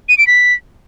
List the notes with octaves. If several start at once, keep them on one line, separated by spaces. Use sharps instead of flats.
D#7
D7
B6